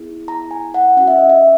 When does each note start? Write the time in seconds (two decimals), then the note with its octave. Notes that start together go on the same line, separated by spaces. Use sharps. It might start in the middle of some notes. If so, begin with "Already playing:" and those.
Already playing: B3 E4 G#4
0.28 A#5
0.51 G#5
0.74 F#5
0.97 C#4 F#4 F#5
1.07 E5
1.19 D#5
1.30 E5